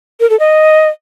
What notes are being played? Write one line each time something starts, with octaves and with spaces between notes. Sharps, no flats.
A#4
A4
D#5